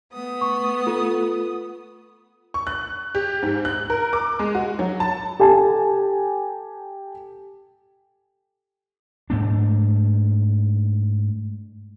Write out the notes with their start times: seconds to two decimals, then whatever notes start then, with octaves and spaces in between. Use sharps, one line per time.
0.12 A3 B3 D#6
0.41 C#6
0.87 F4 A4
2.54 C#6
2.67 F#6
3.15 G4
3.42 G#2
3.65 F#6
3.90 A#4
4.13 D6
4.39 G#3
4.55 F#4
4.79 F#3
5.00 A5
5.40 G4 A4 G#5 A5
9.30 G#2 A3 D4